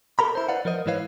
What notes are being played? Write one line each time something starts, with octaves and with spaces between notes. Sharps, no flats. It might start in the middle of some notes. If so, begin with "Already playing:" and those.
A4 A#4 A#5 B5
E4 C5
B4 D5 F5 F#5
F3 A#4 C5 D#5
G#2 E3 E4 B4 C#5 F5